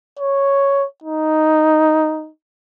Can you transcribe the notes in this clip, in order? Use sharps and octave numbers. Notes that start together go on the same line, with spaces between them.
C#5
D#4